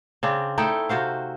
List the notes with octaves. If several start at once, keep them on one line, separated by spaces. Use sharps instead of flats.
C#3 C4 D4
A3 D#4 E4 G5
C3 F#4 C5 F5